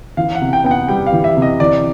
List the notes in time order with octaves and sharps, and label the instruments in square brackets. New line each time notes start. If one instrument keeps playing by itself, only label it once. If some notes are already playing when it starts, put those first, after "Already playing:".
[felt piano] E3 [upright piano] F5
[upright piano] F#5
[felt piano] C3
[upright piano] G5
[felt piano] B3 [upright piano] G5
[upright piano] F#5
[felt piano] G3 [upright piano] G5
[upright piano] F5
[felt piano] E3
[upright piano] E5
[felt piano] C3
[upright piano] D#5
[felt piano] E3 [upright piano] D5